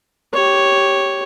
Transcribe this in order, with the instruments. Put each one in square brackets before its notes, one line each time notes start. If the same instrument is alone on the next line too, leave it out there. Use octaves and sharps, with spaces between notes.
[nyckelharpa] G4 C#5